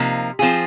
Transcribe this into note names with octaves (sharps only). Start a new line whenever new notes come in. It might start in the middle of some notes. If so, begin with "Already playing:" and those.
Already playing: C3 F3 A#3 D#4
F3 C4 F4 G#4